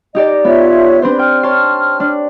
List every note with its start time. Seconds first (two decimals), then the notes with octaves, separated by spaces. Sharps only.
0.15 D#4 G4 D5 D#5
0.45 B3 F4 C#5 E5
1.02 C4 D4 B4 C5
1.19 G5 F6
1.43 C#5 A5 C6
2.00 D4